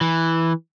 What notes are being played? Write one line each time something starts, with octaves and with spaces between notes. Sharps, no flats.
E3